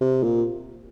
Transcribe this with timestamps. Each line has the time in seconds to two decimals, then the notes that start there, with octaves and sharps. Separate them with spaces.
0.01 C3
0.23 A#2